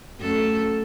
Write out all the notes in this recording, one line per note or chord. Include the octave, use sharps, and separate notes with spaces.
F#2 A3 A4